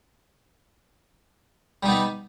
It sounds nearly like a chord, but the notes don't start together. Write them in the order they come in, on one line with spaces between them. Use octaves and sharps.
G3 D#4 B3